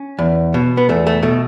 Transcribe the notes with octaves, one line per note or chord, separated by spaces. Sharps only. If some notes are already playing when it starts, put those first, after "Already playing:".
Already playing: C#4
E2
B2
B3
E2 A3
A3
B2 A3